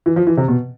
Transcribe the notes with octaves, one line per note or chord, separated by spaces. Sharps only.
E3
F3
E3
C3
B2